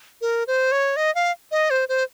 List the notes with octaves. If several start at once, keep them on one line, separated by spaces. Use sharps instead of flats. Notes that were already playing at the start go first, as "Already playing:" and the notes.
A#4
C5
C#5
D#5
F5
D#5
C5
C5